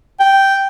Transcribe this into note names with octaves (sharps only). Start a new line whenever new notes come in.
G5